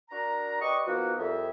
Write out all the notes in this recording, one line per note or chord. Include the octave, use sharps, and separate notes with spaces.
D4 F#4 A#4 A#5
G4 B4 D5 D#5 C#6
F3 A#3 B3 D#4 F#4
C2 F2 E5